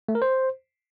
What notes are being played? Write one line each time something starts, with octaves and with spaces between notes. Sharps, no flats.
A3
A#4
C5